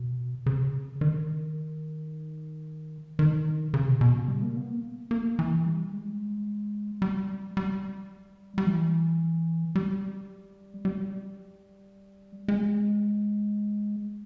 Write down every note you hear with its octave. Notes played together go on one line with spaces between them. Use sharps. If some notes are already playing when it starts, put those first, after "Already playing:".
Already playing: B2
C#3
D#3
D#3
C#3
B2
B2
C#3
G3
A#3
B3
A#3
A#3
E3
G3
G#3
G3
G3
G3
E3
G3
G3
G#3